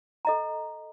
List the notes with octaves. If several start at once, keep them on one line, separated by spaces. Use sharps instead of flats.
A4 D#5 A#5